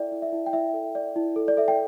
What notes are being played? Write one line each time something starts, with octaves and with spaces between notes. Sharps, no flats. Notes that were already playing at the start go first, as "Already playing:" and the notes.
Already playing: E4 A4 D5 E5 G5
E4
E5
E4
G5
E4 E5
A4
D5
E4
A4
D5
A4 E5
G5